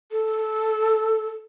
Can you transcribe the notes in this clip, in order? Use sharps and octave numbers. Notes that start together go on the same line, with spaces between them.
A4